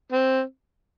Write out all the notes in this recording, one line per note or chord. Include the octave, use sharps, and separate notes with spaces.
C4